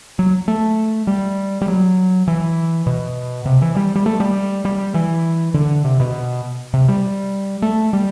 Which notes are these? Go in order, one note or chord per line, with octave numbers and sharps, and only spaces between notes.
F#3
A3
G3
G3
F#3
E3
B2
C3
E3
G3
G3
A3
G3
G3
E3
D3
C3
B2
C3
G3
A3
G3